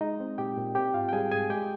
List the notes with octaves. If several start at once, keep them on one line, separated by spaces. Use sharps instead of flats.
G#3 D#4 D#5
C4
A#2 G4 G5
A#2
C4 G4 G5
G#2 F4 F5
G5
G3 G#4 G#5
G#2 G#4 G#5
G#3 G4 G5